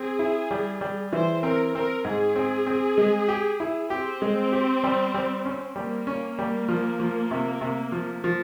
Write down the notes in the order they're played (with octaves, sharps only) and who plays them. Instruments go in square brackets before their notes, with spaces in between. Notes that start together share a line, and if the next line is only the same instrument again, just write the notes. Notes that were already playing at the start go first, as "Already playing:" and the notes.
Already playing: [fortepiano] C4 [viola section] G#4
[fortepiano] E4
G3
G3
[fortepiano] E3 [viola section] C5
[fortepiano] C4 [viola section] A#4
[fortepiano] C4 [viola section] A#4
[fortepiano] G#2 [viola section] G#4
[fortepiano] C4
C4
G#3
G4
E4
[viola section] C4 [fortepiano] G4
[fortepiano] G#3
G4
G3
G3
C#4
[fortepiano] G3 [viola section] A#3
[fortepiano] C#4
G3
F3
F3
C3
C3
F3
F3